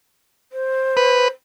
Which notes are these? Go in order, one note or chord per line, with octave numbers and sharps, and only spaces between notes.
C5
B4